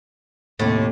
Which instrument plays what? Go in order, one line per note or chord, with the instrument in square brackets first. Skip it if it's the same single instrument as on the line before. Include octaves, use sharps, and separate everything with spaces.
[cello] D#2 C3 [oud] A2